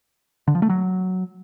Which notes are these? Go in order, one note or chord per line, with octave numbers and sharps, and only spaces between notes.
D3
F3
A3
F#3